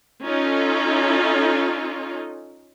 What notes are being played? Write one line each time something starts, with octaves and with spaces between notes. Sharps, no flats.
C#4 D#4 F4 A4